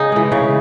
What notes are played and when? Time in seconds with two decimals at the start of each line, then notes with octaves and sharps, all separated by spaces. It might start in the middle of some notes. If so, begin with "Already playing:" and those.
Already playing: C#3 D#4 G#4
0.12 E3 G#3
0.32 C#3